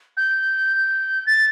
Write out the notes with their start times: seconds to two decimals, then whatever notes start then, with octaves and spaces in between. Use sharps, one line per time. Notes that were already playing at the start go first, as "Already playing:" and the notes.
0.17 G6
1.26 A6